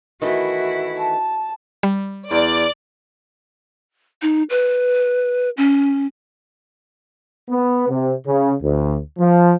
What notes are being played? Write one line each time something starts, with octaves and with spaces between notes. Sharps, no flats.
D#3 E3 A3 E4 F#4
A5
G3
E2 D5
D#4
B4
C#4
B3
C3
C#3
D2
F3